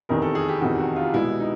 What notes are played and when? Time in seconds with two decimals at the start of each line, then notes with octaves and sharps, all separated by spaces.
0.09 F1 E2 C3 D#3 A#4
0.22 A4
0.35 G#4
0.48 G4
0.61 F1 E2 C3 D#3 F#4
0.79 F#4
0.96 F4
1.13 C2 B2 G#3 B3 E4
1.40 D#4